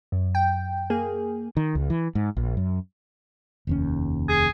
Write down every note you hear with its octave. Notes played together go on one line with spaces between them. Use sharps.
F#2
G5
A#3 G#4
D#3
C#2
E3
G#2
A#1
F#2
F1 D#2 C#4
G#4